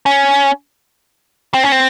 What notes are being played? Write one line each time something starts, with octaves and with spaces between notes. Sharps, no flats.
C#4
C4
C#4
C4